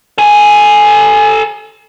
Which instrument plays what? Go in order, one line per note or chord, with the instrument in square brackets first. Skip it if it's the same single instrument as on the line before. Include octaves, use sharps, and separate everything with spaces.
[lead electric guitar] A4 G#5